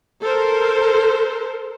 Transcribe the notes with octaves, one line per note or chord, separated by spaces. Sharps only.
A4 A#4 C5